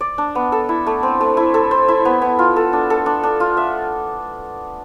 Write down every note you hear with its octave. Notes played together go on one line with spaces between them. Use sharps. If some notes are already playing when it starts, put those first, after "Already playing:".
D5
D4
B3
A4
E4
A3
C4
A3
E4
A4
C5
E4
B3
B3
F4
A4
D4
A4
D4
D4
F4
E5